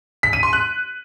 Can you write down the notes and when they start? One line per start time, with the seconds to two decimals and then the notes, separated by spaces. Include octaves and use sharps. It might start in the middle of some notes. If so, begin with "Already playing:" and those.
0.23 B6
0.33 D#7
0.43 C6
0.53 F#6